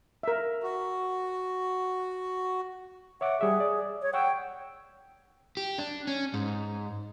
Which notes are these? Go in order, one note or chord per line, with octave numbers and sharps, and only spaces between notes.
A#4 E5
F#4
C#5 E5 F#5 D6
G3 G#4 E5
D5
C#5
F#5 G5 C#6 E6
G4
D4
C#4
G#2